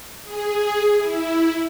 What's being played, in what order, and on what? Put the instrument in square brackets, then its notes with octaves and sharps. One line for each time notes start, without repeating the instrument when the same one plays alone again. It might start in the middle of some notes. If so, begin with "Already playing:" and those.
[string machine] G#4
E4